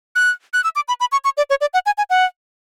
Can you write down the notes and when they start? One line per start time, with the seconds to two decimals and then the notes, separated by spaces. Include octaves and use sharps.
0.16 F#6
0.53 F#6
0.64 E6
0.76 D6
0.88 B5
1.00 B5
1.12 C#6
1.24 C#6
1.37 D5
1.50 C#5
1.61 D5
1.74 F#5
1.86 G#5
1.98 G#5
2.10 F#5